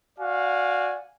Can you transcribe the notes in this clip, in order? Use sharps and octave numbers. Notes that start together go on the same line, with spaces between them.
F#4 D5 F5 G#5